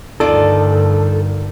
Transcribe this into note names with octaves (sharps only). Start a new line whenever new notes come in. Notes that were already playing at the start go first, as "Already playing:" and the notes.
D2 G2 D#3 F4 A4 D5